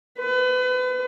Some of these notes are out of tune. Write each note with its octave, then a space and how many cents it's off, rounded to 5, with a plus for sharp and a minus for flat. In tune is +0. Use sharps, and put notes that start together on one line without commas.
B4 +35